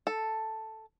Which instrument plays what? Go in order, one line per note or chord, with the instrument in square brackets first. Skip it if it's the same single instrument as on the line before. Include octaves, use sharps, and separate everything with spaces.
[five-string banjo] A4